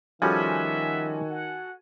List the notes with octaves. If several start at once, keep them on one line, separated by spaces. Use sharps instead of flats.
D#3 F3 G3 C#4 F#4 A4 E5 G#5
F#5